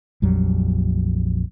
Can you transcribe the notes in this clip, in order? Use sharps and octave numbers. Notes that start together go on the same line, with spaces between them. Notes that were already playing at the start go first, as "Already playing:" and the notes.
A#1 F2 F#3 G3